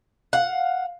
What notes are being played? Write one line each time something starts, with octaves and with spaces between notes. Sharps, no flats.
F5 F#5